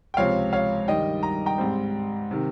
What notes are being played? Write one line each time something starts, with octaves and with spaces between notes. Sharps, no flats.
G5
C#2 C3 F3 C4 C#5 F5
C#5 F5
G2 D#3 G3 D#5 G5
A#5
G5 A#5
G#2 G3 C4
C3 D#3